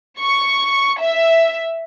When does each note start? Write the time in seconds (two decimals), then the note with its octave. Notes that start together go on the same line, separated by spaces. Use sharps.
0.20 C#6
0.99 E5